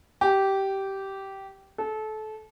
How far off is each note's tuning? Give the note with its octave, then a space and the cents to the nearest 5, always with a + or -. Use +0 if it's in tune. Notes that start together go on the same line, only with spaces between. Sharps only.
G4 -15
A4 -25